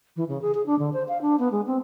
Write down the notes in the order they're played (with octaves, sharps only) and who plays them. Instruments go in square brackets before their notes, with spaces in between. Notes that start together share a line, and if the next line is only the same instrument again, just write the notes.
[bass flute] E3
C#3
G#4
G#4
D4
D3
C5
F5
D4
B3
G#3
C4